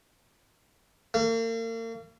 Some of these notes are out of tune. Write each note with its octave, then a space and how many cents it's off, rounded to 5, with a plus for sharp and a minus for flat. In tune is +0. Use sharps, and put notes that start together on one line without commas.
A#3 -40